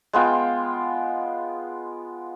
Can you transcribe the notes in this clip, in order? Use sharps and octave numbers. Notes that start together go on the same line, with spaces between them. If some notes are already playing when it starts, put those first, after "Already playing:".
G#3 B3 F4 G5